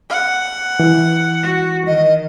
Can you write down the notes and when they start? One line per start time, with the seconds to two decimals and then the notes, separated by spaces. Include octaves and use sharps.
0.10 F#5
0.80 E3
1.43 F#4
1.87 D#3 D#5